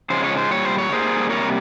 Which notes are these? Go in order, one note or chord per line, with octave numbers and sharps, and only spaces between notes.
C#3 F3 G#3 C5
C#5
C5
A#2 G3 C#5
C5
C#5
D#3 G3 A#3 G#4 C5
C3 G3 A#3 A#4 C#5